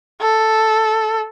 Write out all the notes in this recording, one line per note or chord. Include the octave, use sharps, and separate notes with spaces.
A4